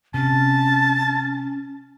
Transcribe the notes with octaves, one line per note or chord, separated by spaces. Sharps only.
C3 C#4 A5